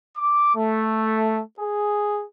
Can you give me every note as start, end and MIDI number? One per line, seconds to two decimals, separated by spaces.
0.17 0.55 86
0.56 1.42 57
1.60 2.24 68